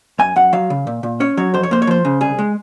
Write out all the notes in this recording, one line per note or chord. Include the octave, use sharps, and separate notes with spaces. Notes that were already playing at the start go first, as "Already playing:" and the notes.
F#2 G#5
F#2 F#5
F#3 F5
C#3
A#2
A#2
C#4 C#5
F#3 C#5
F2 C5
C#5
A#3 C5
C#5
F3 C5
C#3
C2 G#4
G#3